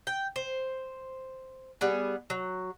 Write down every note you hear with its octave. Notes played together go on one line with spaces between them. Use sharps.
G5
C5
G3 B3 G#4
F#3